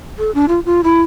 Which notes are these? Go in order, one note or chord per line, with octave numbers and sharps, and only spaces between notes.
A4
D4
F4
F4
E4